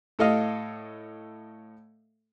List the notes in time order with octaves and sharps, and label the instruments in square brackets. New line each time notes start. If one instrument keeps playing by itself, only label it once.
[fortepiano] A2 A4 D#5 F5